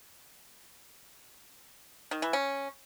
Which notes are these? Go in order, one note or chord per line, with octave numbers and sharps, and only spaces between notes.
D#3
E3
C#4